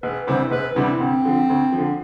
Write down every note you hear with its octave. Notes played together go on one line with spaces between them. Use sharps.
E1 B4
D2 C3 E3 G3 C5
E1 B4
D2 C3 E3 G3 E4
D2 C4
D3 F3
D2
F3
D3